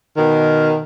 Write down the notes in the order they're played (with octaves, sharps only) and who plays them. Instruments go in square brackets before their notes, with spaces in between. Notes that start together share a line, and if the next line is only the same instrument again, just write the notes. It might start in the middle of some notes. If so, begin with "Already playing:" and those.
[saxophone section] B2 D#3